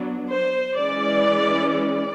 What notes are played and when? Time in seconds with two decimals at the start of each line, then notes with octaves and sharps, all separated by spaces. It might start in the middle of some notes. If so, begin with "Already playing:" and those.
Already playing: F#3 B3 D4
0.28 C5
0.77 E3 G#3 C#4 D5
1.74 D5